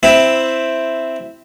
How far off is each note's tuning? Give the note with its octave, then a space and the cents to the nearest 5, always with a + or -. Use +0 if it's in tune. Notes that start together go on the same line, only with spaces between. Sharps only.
C4 +0 E4 +0